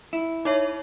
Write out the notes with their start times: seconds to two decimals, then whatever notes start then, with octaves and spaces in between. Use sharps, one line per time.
0.13 E4
0.45 D#4 C#5 E5